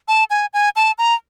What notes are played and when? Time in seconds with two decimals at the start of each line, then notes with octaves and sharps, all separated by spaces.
0.08 A5
0.30 G#5
0.54 G#5
0.76 A5
0.98 A#5